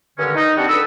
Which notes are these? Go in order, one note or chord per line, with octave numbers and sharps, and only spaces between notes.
G2 D3 D#3 G#3 C#4
D#4
G3 C4 D4 F#4
C#2 D4 A4 B4 D#6 E6